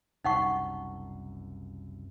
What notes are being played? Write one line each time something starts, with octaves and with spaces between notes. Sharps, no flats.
F#1 C2 F#2 D#4 F#5 C#6